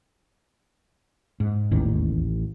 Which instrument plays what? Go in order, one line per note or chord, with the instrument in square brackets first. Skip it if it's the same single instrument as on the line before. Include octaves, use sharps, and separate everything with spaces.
[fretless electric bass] G#2
[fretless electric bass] D#1 E2 D#3 [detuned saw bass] A1